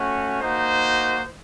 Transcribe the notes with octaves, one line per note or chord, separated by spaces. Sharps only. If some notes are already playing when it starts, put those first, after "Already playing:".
Already playing: A3 C#4 F#4
A#3 D#4 F#4 C5